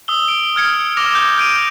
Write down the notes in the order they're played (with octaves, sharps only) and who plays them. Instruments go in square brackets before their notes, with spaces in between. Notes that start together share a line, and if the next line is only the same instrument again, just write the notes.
[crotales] D#6 E6 G7
D7
F6 G#6 C#7
D6 F6 A#6 F7 G7
G6
G6 D7 D#7 F7